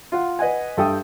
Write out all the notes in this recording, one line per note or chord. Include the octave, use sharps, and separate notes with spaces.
F4 F#5
B4 D#5 F#5 G#5
G2 A4 E5 G5 D#6